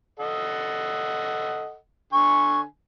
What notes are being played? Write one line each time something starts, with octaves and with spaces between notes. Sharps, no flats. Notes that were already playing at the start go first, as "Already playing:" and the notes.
A4 D#5 F#5
D3 G#5 C#6